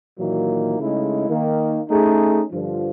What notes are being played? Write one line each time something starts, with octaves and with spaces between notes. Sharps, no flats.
A#2 D#3 E3 F#3 A#3
C#3 G#3 A3 D#4 E4
D#3 A#3
A3 C#4 D#4 G#4
G2 D3 F3